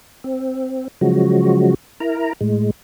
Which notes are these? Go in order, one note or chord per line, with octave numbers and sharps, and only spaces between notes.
C4
C#3 F3 F#3 G#3 F#4
E4 A#4 A#5
A2 G#3